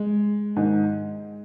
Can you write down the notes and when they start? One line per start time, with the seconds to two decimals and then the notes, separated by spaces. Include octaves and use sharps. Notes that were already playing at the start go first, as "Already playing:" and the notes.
Already playing: G#3
0.56 G#2 D#3